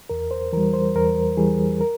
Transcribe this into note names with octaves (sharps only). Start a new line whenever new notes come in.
E2 A#4
C5
E3 G3 A#4
C5
E2 A#4
E3 G3 G#4
A#4